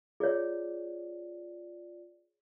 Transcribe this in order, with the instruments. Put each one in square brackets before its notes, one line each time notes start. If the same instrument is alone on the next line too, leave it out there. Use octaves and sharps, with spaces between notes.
[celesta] F4 D5 [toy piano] G#4 C#5